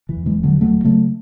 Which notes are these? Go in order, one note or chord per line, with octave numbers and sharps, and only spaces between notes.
E3
E2
E3 G#3
E1
D3 F#3
D2 F#3 A3
C#3 F#3 A3